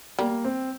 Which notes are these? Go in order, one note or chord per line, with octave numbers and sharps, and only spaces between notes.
G3 A#3
C4